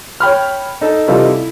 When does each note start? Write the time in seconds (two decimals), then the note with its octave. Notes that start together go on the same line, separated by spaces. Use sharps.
0.20 C#5 G5 B5 F6
0.81 D#4 A4
1.08 C3 E3 G3 D#4 F4 A4
1.25 E4